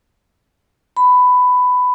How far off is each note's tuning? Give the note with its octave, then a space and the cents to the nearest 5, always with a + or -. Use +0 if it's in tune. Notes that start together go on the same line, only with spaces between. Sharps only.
B5 +15